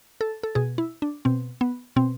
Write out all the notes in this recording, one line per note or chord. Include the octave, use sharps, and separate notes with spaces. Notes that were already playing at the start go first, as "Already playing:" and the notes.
A4
A4
B2 G#4
E4
D4
B2 C4
B3
B2 C4